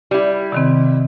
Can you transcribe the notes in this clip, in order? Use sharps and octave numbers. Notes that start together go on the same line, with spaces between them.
G3 E4
C3 D#3 C4